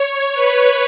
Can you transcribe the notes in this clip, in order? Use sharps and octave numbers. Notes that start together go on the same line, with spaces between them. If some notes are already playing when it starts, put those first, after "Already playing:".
Already playing: C#5
B4